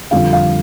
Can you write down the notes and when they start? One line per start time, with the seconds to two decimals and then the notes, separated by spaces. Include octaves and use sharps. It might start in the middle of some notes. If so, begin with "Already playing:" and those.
0.11 F2 D3 G3 F5
0.33 F5